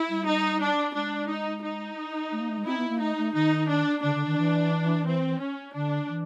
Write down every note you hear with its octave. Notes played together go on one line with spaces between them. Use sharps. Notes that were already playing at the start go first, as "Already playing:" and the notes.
Already playing: E4
G3
D#4
D4
G#3 D4
D#4
D#4
A3
A#3
A3
G#3
C4 E4
B3
A#3
A3 D#4
A3
D#3 D#4
D4
D3 D4
D3
D#3
E3
C4
C#4
D3 D4
E3